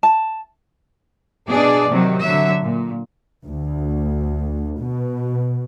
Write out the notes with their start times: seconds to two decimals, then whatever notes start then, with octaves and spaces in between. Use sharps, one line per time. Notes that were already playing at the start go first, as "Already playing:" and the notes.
0.03 A5
1.47 B2 D4 G#4 D5
1.89 C3 D#3 F#3
2.22 D3 F#3 E5
2.62 A#2
3.45 D2
4.80 B2